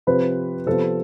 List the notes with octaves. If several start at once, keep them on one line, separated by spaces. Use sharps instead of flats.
C3 F3 C4 B4
C3 F3 B3 A4